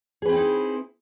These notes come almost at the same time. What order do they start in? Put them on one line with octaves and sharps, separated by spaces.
G#4 B4 C4 E4 D#4